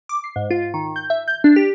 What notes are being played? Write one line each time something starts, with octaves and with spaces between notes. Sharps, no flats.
D6
C7
G#2
F4
D#3
G6
E5
G6
D4
G4